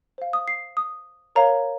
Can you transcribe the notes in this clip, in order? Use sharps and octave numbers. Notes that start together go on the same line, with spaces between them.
C5 F5
D#6
C7
D#6
A#4 C#5 F5 A#5